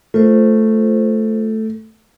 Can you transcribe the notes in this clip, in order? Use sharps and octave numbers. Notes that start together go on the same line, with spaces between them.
A3 F4 C5